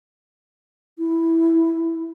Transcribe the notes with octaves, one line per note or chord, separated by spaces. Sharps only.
E4